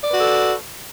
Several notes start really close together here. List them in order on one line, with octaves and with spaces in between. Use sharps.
D5 B4 F#4 A4